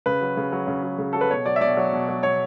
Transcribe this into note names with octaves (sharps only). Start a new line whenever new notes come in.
C#3 B4
F#3
C#3
F#3
C#3
F#3
C#3
F#3 A4
B4
B2 C#5
F#3 D5
E5
B2 D5
F#3
B2
F#3
B2 C#5